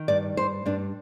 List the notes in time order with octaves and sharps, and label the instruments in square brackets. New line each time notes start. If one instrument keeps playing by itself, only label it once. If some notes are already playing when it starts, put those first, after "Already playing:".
Already playing: [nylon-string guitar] D#3
G2 D5
G2 C5
G2 D4